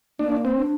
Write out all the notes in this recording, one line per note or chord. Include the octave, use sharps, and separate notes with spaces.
A#3 D4
C4
D4